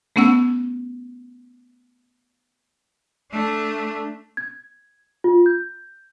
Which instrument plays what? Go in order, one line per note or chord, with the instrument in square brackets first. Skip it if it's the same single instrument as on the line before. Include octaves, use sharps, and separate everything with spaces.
[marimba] A3 B3 C#4 F#5 E6
[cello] A3 D4
[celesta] G#6
F4
G6